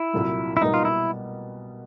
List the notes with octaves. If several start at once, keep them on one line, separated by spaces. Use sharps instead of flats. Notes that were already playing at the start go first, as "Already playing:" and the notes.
Already playing: E4
C2 A#2 F#3
E4
B2 G3 A#3 D#4
F4
E4